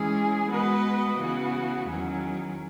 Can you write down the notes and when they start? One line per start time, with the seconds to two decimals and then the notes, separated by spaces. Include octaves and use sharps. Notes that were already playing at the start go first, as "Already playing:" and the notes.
Already playing: E3 G#3 C#4 G#4
0.50 G#3 B3 F#4 B4 D#5
1.19 C#3 E3 B3 F#4
1.87 E2 D#3 F#3 C#4